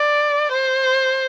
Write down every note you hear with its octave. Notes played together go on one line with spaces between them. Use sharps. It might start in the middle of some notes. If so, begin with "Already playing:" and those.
Already playing: D5
C5